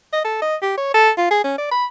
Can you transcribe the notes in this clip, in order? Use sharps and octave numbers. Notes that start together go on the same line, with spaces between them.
D#5
A4
D#5
G4
C#5
A4
F4
G#4
C#4
D5
B5